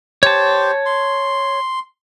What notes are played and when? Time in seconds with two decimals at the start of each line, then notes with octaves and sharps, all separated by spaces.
0.23 G4 C5 C#5 A5
0.86 C6